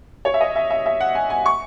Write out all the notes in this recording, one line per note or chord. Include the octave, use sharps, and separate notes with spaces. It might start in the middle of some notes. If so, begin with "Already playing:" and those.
C#5
E5
D#5
E5
E5
E5
F#5
G#5
G#5
C#6